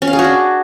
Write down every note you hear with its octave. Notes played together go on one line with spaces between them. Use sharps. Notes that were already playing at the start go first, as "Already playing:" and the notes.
C#4
F5
G#4
F#4
D4